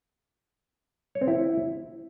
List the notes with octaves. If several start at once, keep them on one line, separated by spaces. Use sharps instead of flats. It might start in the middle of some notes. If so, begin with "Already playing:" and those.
C#5
C4
E4